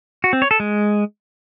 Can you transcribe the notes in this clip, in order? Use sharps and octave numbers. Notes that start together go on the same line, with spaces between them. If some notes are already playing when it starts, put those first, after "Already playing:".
F#4
C4
C#5
A4
G#3